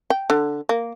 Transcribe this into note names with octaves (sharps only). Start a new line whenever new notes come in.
G5
D3
A#3